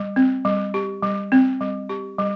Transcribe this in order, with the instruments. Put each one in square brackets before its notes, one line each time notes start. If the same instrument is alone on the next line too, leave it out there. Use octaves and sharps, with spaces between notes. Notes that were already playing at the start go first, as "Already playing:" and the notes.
Already playing: [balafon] G3
C4
G3
G4
G3
C4
G3
G4
G3